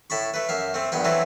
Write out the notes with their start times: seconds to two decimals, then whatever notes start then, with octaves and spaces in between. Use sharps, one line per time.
0.10 A2 A5 B5 C#6
0.34 A3 B4
0.49 F#2 E5 F5
0.74 A3 C4
0.92 A#1 G2 B3 G5
1.04 E3 F#3 A3 C4 B4